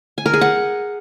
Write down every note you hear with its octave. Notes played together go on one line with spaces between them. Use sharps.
G#5
A#4
G#4
F#5